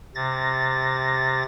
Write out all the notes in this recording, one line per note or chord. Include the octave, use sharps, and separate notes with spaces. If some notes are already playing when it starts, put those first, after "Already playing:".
C3 A6 A#6